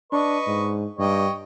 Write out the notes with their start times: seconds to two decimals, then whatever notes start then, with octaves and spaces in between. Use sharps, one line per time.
0.12 D4 B4 D#5 C#6
0.47 G#2
0.99 G2 C#5 D#5 G5